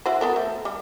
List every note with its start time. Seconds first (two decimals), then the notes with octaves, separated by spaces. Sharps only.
0.06 E4 F#4 C5
0.21 B3 A4 A#4
0.36 A3
0.65 G3